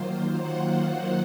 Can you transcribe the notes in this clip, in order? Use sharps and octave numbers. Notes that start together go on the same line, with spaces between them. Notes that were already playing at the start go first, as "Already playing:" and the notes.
Already playing: D#3 F#3 A#3 F4 C5
F#5